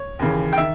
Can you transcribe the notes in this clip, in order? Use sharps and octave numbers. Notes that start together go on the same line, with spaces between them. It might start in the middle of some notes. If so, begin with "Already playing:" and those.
Already playing: C#5
D#2 C#3 E3
G5
D#3 E5